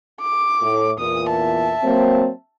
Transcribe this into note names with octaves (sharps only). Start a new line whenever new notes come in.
D6
A2
E2 A#2 D#6
E5 A5
F#3 A#3 C4